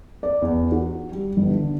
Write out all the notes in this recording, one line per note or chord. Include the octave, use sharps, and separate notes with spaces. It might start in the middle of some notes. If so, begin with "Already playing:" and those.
D5
E2
F#4
G3
G1
D3